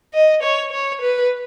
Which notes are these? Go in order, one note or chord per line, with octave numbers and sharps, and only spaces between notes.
D#5
C#5
C#5
B4